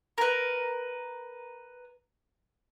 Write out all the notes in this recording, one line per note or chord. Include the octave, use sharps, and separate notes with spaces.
A#4 B4